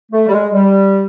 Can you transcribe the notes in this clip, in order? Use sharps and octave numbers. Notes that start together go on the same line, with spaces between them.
A3
G3
G#3
G3